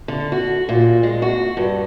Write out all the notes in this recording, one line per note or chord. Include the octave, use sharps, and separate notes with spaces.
D3
F#4
A#2
G#3
F#4
G2